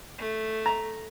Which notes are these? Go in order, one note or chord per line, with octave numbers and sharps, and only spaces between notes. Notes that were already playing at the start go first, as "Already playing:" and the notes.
A3
A#5